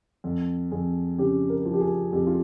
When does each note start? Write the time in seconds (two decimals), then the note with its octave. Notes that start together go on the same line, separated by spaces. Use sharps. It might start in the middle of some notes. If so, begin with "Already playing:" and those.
0.24 F2
0.71 F2 G#4
1.18 C#3 G4
1.49 A#4
1.65 F3
1.74 G4
1.81 G#4
2.12 F2 G4
2.27 F4